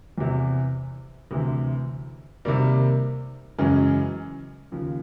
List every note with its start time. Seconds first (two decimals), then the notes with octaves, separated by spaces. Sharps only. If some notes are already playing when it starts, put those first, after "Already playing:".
0.18 E2 C3 E3
1.31 D2 C3 E3
2.45 C3 D#3 G3 A#3
3.58 F#2 C#3 E3 G#3 C#4
4.72 D#2 C#3 F3